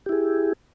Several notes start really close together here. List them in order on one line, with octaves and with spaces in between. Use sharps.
G4 E4 G#4